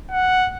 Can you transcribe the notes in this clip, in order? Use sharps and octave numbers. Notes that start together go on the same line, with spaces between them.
F#5